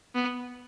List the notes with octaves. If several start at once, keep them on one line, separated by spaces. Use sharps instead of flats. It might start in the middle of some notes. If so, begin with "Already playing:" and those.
B3